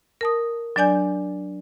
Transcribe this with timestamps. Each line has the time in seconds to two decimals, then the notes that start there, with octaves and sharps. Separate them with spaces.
0.21 A#4 A5 D#6
0.76 F#3 D4 D5 G#5 G6